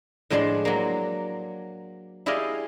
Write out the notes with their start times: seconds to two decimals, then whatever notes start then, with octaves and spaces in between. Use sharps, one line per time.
0.30 A2 F3 G#3 D4 D5 C6
0.65 F#3 A#3
2.26 E4 G4 G#4 D5 D#5 F5